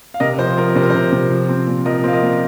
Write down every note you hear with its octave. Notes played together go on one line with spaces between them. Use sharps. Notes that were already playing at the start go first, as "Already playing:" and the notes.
F5
C3 A#4 D#5
F3 C5
F3 A#4
C3 C5
A#4
C3 C5
C3
F3
C4
A#2
F3 A#4 D#5
C4 F5
A#4 D#5
A#2